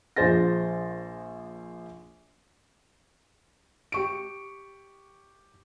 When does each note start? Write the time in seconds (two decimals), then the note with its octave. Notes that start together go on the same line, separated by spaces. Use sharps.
0.16 A#1 F3 G#4 C5 A6 A#6
3.92 G4 C#6 D7